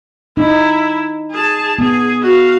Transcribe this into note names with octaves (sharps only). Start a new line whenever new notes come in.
D#4 E4
G#4 A5
B3 G#4
F#4 F5